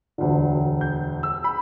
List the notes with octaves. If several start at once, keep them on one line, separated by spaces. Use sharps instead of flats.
E1 D2 D3
G6
E6
B5